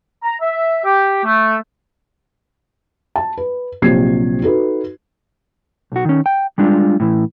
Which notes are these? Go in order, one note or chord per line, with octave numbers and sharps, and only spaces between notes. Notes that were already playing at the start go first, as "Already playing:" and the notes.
A#5
E5
G4
A3
A5
B4
A#1 C3 F#3 C4 G#6 C7
D#4 F#4 A4 B4
B1 F#4
D#3 C#4
G5
G3 G#3 D4 F4
A2 E3